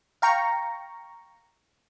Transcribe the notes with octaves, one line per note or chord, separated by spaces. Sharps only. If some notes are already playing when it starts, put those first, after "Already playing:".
F5 G5 A#5 C#6